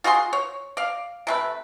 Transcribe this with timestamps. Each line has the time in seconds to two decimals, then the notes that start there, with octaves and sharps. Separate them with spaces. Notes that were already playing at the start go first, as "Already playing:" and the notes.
0.04 F4 F#4 G#4 C6
0.33 C#5
0.77 D5 F5
1.27 C3 A3 B4